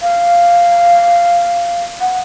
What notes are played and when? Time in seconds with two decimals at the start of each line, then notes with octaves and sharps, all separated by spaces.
0.01 F5
2.01 F#5